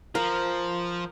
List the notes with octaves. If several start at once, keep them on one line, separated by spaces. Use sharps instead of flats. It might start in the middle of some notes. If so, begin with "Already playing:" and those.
F3 A#4 C5